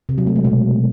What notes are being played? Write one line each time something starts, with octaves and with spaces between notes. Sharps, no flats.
C3
F#3
A3
G#3
B2